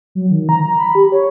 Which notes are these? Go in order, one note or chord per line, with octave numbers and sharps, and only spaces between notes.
F#3
D#3
A#5
A#5
B5
G4
C#5